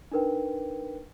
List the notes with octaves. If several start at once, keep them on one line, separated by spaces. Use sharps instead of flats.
D4 D#4 A#4 B4 G5